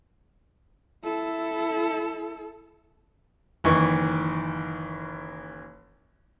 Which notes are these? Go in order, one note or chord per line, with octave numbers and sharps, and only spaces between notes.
E4 A4
F#1 D#3 E3 C#6